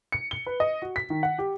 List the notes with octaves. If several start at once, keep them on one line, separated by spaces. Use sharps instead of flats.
C#7
G7
B4
D#5
F#4
B6
D#3
F#5
G4